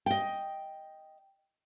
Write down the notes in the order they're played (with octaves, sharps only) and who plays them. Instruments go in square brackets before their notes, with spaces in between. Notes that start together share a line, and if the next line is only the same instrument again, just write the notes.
[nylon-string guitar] D#5 G5